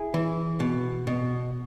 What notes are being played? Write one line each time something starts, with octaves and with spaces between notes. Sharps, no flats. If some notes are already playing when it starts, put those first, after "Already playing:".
Already playing: E4 G#4
E3
B2
B2